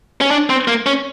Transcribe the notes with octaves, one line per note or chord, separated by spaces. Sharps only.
C#4
D4
C4
A#3
C#4